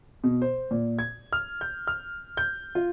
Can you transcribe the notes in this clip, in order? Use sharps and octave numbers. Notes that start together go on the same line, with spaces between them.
B2
C5
A#2
G#6
F6
G6
F6
G6
F4